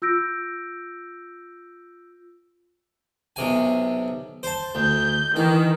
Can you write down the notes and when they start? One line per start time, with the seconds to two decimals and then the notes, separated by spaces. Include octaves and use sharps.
0.02 F4 E6 G6 A#6 D7
3.36 B1 C3 G#5
4.43 C5 A5
4.75 D2 G6
5.36 D#3 E3